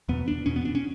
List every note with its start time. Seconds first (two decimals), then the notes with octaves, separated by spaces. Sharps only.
0.09 E2 B2 B3
0.28 D4
0.46 E2 B2 C#4
0.56 B3
0.65 D4
0.75 C#4